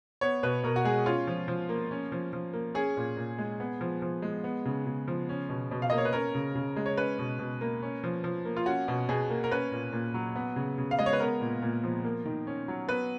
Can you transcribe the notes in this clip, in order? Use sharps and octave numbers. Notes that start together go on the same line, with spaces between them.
B3 C#5
B2 B4
B2 A#4
F#4
G#3 G#4
C#4 F4
F3
F3
A#3
C#4
F3
F3
A#3
C#4 G#4
A#2
A#2
G#3
B3
F3
F3
G#3
B3
C#3
C#3
F3
C#4
B2
B2
F5
A#3 D#5
C#5
B4
C#4 A#4
C#3
C#3
G#3
C#5
C#4 B4
B2
B2
A#3
C#4
F3
F3
A#3
F4
C#4 F#4
B2
B2 G#4
A#3
A#4
C#4 B4
A#2
A#2
F#3
B3
C#3
C#3
F5
G#3 D#5
C#5
B4
B3 A#4
A#2
A#2
F3
A#3
D#3
C#4
F#3
B3 B4